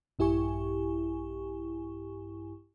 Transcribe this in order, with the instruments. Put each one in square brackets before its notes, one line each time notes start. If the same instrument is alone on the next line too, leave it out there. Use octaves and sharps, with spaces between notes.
[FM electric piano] A#1 G2 E4 G4 G#5 C#6